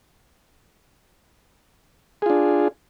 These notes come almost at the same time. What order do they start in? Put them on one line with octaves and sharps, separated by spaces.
G#4 F4 D4